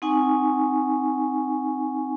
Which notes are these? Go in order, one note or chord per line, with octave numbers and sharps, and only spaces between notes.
C4 D#4 F#5 G#5 C#6